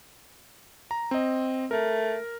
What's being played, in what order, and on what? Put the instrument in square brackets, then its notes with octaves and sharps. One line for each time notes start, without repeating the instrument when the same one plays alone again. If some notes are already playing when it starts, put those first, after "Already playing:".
[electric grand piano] A#5
C4 D#5
[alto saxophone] A3 [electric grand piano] A#4